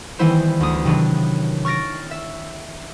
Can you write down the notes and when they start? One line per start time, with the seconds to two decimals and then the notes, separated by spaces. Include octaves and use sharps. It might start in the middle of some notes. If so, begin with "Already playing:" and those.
0.19 D#3 E3 G3 B3 E4 C5
0.60 D2 D#6
0.84 C3 D#3 F#3 B3 D4
1.65 C#6 F6 A6 A#6 D7
2.11 E5